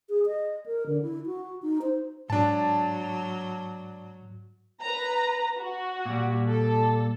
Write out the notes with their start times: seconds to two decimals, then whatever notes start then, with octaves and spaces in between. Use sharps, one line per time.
0.09 G#4
0.26 D#5
0.66 A#4
0.87 D3
1.02 E4
1.26 F#4
1.62 D#4
1.82 C5
2.30 G#2 F#3 D4 A5
4.81 B4 A#5
5.58 F#4
6.06 A#2 G3
6.49 A4